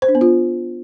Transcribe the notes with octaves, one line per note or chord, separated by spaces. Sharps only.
C5
D4
B3
F4